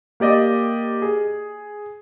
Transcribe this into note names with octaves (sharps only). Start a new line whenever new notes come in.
A#3 G4 D5 D#5
G#4